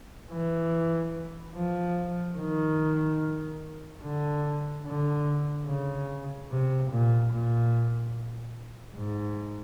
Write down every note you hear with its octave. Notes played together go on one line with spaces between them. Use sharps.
E3
F3
D#3
D3
D3
C#3
C3
A#2
A#2
G#2